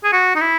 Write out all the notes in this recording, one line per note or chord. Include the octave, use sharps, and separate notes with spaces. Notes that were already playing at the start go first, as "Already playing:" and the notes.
G#4
F#4
D#4
E4